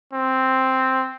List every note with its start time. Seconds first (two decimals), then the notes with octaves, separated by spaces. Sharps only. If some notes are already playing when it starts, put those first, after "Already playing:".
0.13 C4